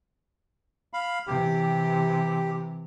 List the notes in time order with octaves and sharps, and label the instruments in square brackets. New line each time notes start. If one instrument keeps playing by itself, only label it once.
[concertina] F5 B5
[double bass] C3 E3 [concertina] G4